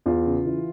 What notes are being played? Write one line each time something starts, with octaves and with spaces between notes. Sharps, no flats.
E2 F4
C#3
E3